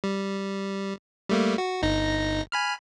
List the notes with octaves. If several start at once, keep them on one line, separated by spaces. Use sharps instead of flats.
G3
G3 A3 A#3
F#4
G1 D#4 A#6
G#5 B5 F6